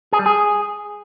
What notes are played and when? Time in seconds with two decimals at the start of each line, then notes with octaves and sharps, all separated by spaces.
0.13 G#4
0.19 G3
0.26 G#4